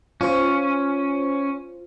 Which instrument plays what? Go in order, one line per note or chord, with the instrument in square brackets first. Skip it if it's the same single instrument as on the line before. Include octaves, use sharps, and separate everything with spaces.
[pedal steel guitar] C#4 [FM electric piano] F4 C5